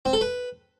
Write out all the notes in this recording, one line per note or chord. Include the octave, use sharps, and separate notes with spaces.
C4
A4
B4